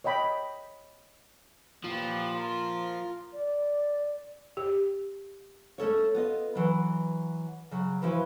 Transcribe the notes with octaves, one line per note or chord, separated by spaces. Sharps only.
C#5 D#5 G5 B5
A#2 F3 G4 B4
F4 A#4
D5
G4
A3 C#4 A4 C#5
B3 F4 D#5
E3 F#3
C#3 F#3
E3 F3 E4 F#4 B4